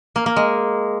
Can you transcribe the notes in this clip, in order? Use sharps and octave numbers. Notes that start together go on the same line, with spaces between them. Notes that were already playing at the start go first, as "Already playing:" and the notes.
A#3
A#3
G#3